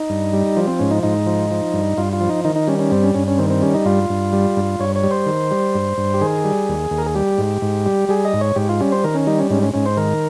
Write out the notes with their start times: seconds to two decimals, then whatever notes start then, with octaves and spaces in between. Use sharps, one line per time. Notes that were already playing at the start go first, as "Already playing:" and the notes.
Already playing: D#4
0.10 G2
0.33 G3
0.57 F3
0.67 C4
0.79 G#2 C#4
0.91 D#4
1.03 G#2 D#4
1.26 F3
1.51 F3
1.74 G2
1.97 G2 F4
2.13 F4
2.21 F3
2.29 D#4
2.44 D#3 D#4
2.56 D#4
2.67 G3 C#4
2.79 C#4
2.91 G2 C4
3.03 C#4
3.15 G2 C#4
3.28 C#4
3.38 D#3 C4
3.50 C4
3.62 G3 C#4
3.75 D#4
3.86 G2 F4
4.10 G2
4.33 G3
4.57 G2
4.80 G2 C#5
4.96 C#5
5.03 G3
5.11 C5
5.26 D#3
5.51 G3
5.75 G2
5.98 G2
6.14 G4
6.21 D#3 G#4
6.44 G3
6.69 D#2
6.91 D#2
6.98 A#4
7.06 G#4
7.15 G3 G4
7.38 G#2
7.62 G#2
7.86 G3
8.09 G3 G#4
8.25 D#5
8.34 G#2
8.41 C#5
8.56 G#2 G4
8.69 F4
8.80 G3 C#4
8.92 C5
9.04 D#3 A#4
9.15 C#4
9.27 G3 D#4
9.38 C#4
9.50 G#2 C#4
9.63 C#4
9.74 G#2 C#4
9.86 C5
9.97 D#3 A#4